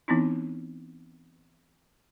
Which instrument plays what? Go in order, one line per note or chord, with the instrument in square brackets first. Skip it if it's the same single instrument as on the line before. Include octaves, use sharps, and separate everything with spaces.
[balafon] E3 B3 C4 D#4 E4